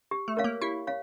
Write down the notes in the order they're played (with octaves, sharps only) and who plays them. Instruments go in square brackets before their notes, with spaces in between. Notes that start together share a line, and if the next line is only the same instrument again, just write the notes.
[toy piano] G4
[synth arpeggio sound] A3
[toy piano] A#4 C#5 F5
[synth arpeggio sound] A#3
[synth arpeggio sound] E4 [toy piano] G4
[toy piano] C#5 F5